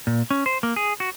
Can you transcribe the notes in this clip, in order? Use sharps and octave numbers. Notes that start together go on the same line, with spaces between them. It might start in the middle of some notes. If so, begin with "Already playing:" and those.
A#2
C#4
C5
A#3
G#4
F#4